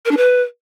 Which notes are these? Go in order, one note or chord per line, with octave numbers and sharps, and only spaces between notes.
A#4
D4
B4